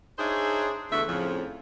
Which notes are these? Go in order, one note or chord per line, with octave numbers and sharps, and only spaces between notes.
D4 D#4 G#4 C5 C#5 E5
E2 D3 A3 F#4 E5
F2 A2 C#3 F3